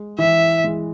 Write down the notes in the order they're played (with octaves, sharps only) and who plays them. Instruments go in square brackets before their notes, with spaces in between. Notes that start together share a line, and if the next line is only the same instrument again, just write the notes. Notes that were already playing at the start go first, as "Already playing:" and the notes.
Already playing: [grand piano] G#3
[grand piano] E3 [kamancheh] E5
[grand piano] G#3